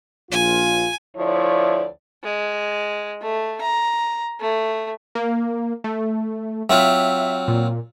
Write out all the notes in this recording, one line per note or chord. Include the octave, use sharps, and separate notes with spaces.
A#1 F4 G#5
D2 F3 E4 C#5 D5
G#3
A3
A#5
A3
A#3
A3
F#3 C4 F4 E5
A#2